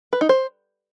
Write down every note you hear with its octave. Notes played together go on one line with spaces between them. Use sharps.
B4
D#4
C5